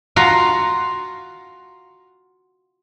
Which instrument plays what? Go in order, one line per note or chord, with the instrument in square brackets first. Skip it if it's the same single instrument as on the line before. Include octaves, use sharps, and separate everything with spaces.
[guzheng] F4 F#4 F5 A#5